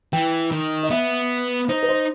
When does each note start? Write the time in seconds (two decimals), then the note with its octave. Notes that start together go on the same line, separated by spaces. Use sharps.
0.13 E3 G5
0.51 D#3
0.83 D#5
0.90 B3 E5
1.69 D#4 C5
1.83 B4
1.89 C5